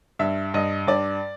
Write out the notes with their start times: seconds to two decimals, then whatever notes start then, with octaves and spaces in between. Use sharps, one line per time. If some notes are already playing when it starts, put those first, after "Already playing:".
0.19 G2 E5
0.54 G2 D#5
0.87 G2 D5